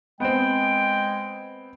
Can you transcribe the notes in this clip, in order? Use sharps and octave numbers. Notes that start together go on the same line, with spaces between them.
G#3 B3 C4 G5